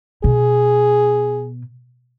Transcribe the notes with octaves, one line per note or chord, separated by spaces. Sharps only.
B2 G#4